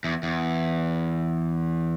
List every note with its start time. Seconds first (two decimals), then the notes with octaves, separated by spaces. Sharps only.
0.04 E2
0.23 E2